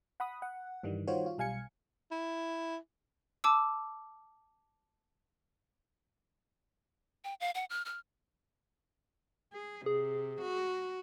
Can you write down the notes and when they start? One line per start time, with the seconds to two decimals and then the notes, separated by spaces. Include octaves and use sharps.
0.20 F#5 B5 D#6
0.42 F#5
0.83 G2 D#3 E3 G3
1.07 D#3 G3 F4 F#4 C5 C#5
1.26 F4
1.38 B1 G3 F5 G#5 G#6 C#7
2.11 E4
3.44 A5 D6 E6
7.24 G5
7.40 F5
7.55 F#5
7.70 F6
7.85 F6
9.53 G#4
9.86 C3 G#4
10.42 F#4